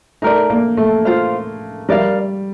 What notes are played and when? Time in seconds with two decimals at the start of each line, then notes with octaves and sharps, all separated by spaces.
0.22 A3 D#4 A#4 D5
0.50 A#3
0.77 A3
1.05 F4 C5 F5
1.89 G3 A#4 D5 F5